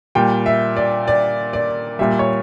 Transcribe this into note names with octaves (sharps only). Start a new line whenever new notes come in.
A#2 G3 G5
E5
D5
D5
D5
A#2 G3 E5
C#5